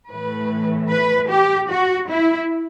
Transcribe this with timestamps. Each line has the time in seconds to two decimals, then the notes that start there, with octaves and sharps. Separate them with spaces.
0.11 A2 E3 A3 B4
0.90 B4
1.29 G4
1.69 F#4
2.08 E4